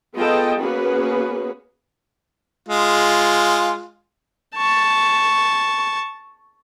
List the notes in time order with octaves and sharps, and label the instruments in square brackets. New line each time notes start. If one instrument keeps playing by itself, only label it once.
[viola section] B3 F4 G#4 A4 D#5 G5
A#3 B3 C#4 F#4 G#4 B4
[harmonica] G#3 F4
[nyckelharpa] A5 C#6